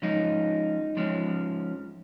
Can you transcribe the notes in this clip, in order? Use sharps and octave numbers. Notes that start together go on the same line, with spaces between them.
F3 G#3 C#4 D#4
F3 G#3 C#4